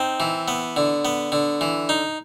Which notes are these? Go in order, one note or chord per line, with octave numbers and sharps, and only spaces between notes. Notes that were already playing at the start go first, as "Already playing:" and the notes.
Already playing: C4 D#4
E3
B3
D3
B3
D3
E3
D#4